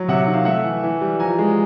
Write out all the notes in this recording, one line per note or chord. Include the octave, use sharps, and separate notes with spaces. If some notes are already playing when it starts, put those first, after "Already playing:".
Already playing: F#3
C3 E5 F#5
E5
D#3
F5
A3 E5 F#5
E3
E3
G3
F3 G#5 A#5
G#3